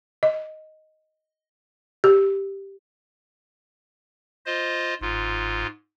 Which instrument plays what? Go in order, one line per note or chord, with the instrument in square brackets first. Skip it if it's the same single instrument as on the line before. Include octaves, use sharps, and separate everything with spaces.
[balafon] D#5
G4
[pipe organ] F4 C5 D#5
[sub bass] G1 [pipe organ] G#2 F4